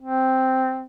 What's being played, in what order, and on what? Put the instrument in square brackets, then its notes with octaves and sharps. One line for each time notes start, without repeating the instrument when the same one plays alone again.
[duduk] C4